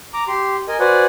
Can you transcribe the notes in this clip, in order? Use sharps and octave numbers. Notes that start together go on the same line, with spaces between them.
A#5 D6
G4 C6
A#4 D#5 G#5
F#4 B4 C5 D5 F#5 G#5